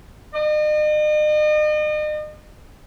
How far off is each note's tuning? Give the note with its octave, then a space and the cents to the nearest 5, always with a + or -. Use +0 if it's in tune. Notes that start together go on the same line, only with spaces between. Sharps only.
D#5 -40